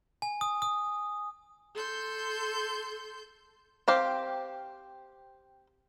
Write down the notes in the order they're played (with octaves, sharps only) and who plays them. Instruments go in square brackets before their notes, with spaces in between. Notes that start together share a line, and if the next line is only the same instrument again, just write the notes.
[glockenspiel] G#5
D#6
D#6
[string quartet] A4 C6 G6
[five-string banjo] C4 G4 F5